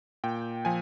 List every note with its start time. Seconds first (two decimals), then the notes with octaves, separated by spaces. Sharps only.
0.24 A#2 G5
0.65 F3 G#5